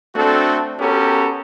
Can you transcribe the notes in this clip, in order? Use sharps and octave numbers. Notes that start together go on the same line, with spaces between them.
A3 C4 D4 F#4 A4
B3 C#4 F#4 G4 A4 A#4